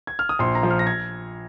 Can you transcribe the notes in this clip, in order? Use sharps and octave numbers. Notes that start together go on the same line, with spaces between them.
G#6
F6
D#6
A#1 C6
A#5
F3
F6
A#6
G#6